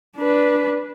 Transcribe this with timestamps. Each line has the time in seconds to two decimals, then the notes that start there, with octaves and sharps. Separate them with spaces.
0.17 D4 B4